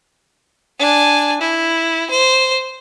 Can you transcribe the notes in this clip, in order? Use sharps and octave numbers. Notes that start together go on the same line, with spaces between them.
D4 G#5
E4
C5